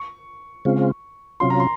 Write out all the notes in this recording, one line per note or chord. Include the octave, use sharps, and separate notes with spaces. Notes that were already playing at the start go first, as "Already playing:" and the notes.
Already playing: C#6
C#3 G#3 C4 F4
C3 F#3 C#4 F4 C6
A#5
C6